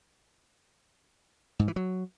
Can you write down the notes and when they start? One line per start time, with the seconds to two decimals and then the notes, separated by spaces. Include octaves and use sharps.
1.59 G#2
1.68 E3
1.76 F#3